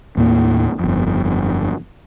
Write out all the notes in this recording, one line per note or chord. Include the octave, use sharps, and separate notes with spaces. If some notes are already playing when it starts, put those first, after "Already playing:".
D#2 A2 A#3
G1 F2